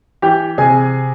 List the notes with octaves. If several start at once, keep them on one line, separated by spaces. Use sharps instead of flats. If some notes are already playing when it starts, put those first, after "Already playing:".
E3 G4 G5
C3 G#4 G#5